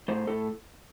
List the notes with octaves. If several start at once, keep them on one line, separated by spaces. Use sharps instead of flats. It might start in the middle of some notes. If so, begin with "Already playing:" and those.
A2 C5
A2 A4